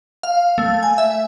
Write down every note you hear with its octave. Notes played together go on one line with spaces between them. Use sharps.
F5
A3
G#5
E5